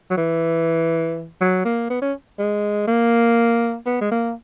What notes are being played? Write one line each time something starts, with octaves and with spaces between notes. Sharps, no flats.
F#3
E3
F#3
A#3
B3
C#4
G#3
A#3
B3
G#3
A#3